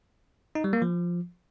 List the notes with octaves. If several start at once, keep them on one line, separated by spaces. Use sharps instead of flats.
D#4
G3
A#3
F3